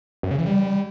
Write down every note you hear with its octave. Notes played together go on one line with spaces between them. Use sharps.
F#2
C#3
E3
G3